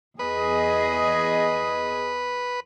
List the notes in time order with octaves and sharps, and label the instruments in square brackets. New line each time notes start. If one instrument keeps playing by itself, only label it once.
[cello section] E2 G#4 D#5 [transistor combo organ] B4